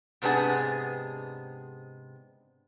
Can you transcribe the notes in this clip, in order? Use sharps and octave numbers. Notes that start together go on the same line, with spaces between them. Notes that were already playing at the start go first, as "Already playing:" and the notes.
G#2 C3 B3 D4 G#4